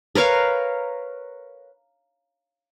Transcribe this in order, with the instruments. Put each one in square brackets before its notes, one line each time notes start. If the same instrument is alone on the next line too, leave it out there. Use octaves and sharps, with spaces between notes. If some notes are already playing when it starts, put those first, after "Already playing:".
[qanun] A#4 B4 C#5 F5